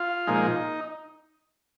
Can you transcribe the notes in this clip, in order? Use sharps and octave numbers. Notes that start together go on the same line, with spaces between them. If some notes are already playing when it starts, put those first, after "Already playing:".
Already playing: F4
A#2 F3 G#3 D#4